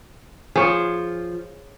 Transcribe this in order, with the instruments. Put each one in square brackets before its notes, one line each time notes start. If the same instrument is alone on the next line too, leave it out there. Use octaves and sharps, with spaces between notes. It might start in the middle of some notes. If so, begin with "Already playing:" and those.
[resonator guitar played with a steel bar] F3 [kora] G#4 C#5